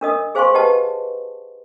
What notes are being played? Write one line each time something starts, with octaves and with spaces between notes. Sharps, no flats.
D4 A#4 D#5 D#6
G#4 C5 F5 G#5 C6 C#6
G4 B4 D#5 F#5 A5